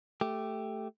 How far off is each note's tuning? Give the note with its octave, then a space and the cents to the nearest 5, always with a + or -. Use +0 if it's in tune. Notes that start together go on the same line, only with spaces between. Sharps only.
A3 +0 G4 +0